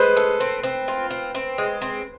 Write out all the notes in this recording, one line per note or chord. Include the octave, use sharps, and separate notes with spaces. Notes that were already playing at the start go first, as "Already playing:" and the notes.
Already playing: G#3 B4 C5
A4
C4
C4
F4
C4
C4
G#3
C4